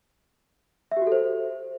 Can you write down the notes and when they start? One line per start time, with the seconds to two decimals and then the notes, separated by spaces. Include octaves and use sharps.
0.92 E5
0.97 G4
1.02 F#4
1.07 A4
1.12 C5